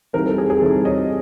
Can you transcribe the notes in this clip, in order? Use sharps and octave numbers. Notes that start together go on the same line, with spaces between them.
E3 G3 C4 D#4 A#4 C5
A4
G#4
G#4
E3 G3 C4 D#4 A4
C#5 D#5